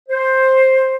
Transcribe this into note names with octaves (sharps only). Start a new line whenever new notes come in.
C5